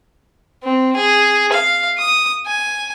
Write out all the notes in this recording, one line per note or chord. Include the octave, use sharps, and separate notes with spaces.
C4
G#4
F5
D#6
G#5